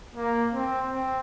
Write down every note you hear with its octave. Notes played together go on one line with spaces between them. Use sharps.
A#3
C4
C4